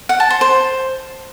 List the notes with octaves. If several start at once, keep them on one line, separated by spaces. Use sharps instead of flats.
F#5
A5
C5
C5